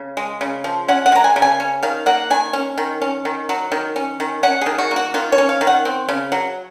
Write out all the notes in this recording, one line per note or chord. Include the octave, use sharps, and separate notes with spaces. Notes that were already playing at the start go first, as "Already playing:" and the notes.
Already playing: C#3
G#3
C#3
F3
C#4 F#5
F#5
G#3 A#5
G#5
C#3
G#5
C#4
D#3 F5
A#3 F#5
D#3 G#5
C#4
D#3
C#4
D#3
F#3
D#3
C#4
D#3
C#4 F#5
D#3 G#4
F#4
A#3
F#4
D#3 F4
C#5
C#4
F5
D#3
F#5
C4
C#3
F#3